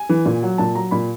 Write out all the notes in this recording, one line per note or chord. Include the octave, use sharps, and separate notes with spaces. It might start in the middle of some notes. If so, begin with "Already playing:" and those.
Already playing: G#5
E3
A#2
F#3
A#2 A5
F#3 A#5
A#2 B5